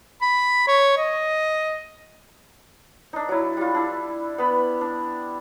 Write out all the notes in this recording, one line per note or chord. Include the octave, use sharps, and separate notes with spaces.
B5
C#5
D#5
D4 D#4
F#3 E4
G3 F4
D4 E4
B3 B5
D4